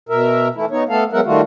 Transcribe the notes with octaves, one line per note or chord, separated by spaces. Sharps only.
B2 A#4 E5
E3 A3 E4
B3 D#4 C#5
A3 B3 A4 F5
F#3 G#3 B3 A#4 E5 F#5
D#3 G3 A3 F4 F#4